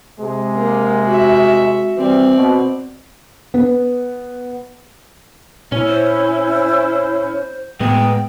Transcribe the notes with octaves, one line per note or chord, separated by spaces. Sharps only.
C3 G#3
A#3
F#4 E5
E3 G3 C4 D5
B2
B3
A#2 C#4 E4
C5
A2 G#3 B3 G5